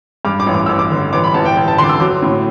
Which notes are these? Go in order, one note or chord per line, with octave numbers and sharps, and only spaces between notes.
G2 D6
D6
A1
D6
A1 E6
D6
D3
A1 D6
B5
A1 A5
G5
A1
A5
D3 C6
D6
E6
F#3 D6
A2